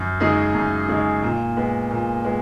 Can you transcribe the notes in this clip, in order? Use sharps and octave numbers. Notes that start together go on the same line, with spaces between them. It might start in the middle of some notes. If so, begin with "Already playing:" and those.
Already playing: F#2
C#3 G#3 D#4 G#4
F#2
C#3 G#3 D#4 G#4
A#2
G#3 B3
A#2
G#3 B3